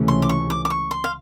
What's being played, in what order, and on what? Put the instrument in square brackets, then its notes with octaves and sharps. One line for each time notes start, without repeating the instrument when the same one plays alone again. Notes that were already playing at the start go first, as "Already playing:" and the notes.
Already playing: [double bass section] C#2 C3 E3 A3 C#4
[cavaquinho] C6
D6
C#6
D6
D6
C#6
C6
F5